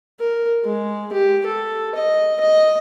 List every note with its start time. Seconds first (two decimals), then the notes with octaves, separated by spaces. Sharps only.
0.20 A#4
0.65 G#3
1.13 G4
1.46 A4
1.95 D#5
2.41 D#5